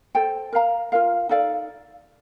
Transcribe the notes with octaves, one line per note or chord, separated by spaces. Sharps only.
A4 C5 G5
A#4 F5 A#5
F4 A#4 F5
D#4 A4 D5 F5